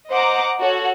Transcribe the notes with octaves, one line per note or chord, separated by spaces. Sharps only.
C5 D#5 F#5 A#5 D6
F#4 A4 C#5